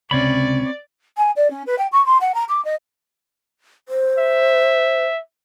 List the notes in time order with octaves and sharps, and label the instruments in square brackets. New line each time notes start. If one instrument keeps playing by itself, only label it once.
[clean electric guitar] C#2 C3 C#4 [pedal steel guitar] C4 C#5 B5 [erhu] D5
[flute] G#5
D5
C#4
B4
G5
C#6
C6
F#5
A#5
D6
D#5
[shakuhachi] C5
[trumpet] E5